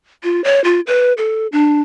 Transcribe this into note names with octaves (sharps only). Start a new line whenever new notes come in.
F4
C#5
F4
B4
A4
D4